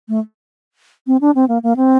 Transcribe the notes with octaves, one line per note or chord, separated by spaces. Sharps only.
A3
C4
D4
C4
A#3
A#3
C4